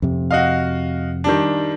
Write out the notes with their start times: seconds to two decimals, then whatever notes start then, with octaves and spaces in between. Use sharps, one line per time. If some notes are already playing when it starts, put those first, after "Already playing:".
0.02 F2 C3
0.31 F#4 D#5 F5
1.24 D#3 G3 D4